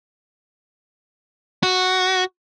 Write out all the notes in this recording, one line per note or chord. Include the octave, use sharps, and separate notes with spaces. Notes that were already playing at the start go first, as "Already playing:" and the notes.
F#4